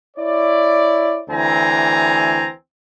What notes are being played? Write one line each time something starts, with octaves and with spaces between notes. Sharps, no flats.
E4 C#5 D5
D2 E3 C4 G#5 A#5